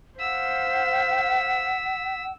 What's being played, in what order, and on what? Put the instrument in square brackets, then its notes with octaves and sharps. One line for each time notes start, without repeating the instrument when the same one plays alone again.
[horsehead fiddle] C5 F5 [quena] F#5 [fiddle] E6 [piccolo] B6